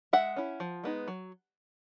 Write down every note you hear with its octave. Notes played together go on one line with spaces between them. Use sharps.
G#3 E5 F#5
C#4 E4
F3
G#3 B3 D#4
F#3